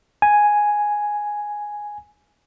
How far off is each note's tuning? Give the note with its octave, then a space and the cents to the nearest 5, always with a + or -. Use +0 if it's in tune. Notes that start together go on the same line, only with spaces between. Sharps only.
G#5 +0